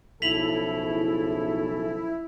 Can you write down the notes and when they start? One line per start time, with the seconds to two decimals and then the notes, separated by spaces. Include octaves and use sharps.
0.22 B1 C#3 F3 E4 A4 B6 F7 F#7